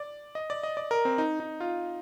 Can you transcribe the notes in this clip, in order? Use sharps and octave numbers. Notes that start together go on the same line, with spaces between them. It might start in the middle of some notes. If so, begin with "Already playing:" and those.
Already playing: D5
D#5
D5
D#5
D5
A#4
C4
D#4
D#4
F4